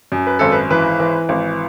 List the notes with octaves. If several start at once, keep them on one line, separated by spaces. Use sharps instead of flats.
F#2
B4
G#1 A4
B4
E3 B4
E3
G#1